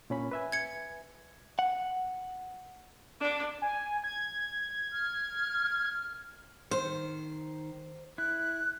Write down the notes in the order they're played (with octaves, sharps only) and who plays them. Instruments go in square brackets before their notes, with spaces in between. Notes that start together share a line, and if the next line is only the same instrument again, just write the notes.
[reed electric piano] A#2 C#4 B5
B4 E5 G#5
[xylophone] G#6 C#7
[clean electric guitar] F#5
[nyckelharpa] D4
[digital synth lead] G#5
G#6
[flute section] F6
[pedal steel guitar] D#3 F6 G6 [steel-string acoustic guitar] C5
[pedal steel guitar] E4 [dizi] F#6